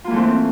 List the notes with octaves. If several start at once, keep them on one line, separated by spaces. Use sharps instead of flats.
E3 A3 A#3 C4 F4